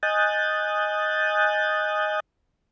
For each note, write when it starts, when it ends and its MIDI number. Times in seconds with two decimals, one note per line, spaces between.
0.03 2.20 75
0.03 2.20 80
0.03 2.20 87
0.03 2.20 90
0.03 2.20 91
0.03 2.20 93